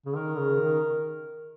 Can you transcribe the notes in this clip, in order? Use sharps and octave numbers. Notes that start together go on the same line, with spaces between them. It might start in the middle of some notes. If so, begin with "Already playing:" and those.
C#3
D#3 A#4
C#3
D#3